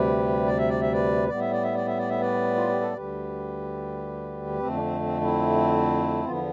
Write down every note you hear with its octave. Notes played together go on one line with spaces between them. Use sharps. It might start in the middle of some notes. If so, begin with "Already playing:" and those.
Already playing: D2 C3 G3 G4 B4
D5
E5
D5
E5
B4 D5
A2 G3 B3 D5
E5
D5
E5
D5
E5
D5
E5
B4 D5
F4
G4
A4
D2 D3 G3 G4 B4
F2 D3 A3 C4
D4
C4
C4
C4 E4
E2 D3 F3 B3 F4
E4